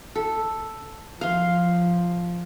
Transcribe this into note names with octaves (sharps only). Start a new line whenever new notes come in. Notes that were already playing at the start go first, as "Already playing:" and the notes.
A4
F3 F5 C6